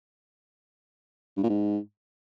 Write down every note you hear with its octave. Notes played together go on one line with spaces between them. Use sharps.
G2
A#2
G#2